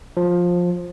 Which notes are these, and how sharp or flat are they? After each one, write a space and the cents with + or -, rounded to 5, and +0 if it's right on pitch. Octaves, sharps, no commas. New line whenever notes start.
F3 +15